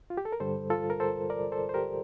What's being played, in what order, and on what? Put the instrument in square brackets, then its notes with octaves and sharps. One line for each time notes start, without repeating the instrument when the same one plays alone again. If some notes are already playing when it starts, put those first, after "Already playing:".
[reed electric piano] F4
G4
A4
A#4
G2 D3 G3 A4 C5
F4 A4
A#4
A4 C5
A#4 D5
A4 C5
C5
G4 A#4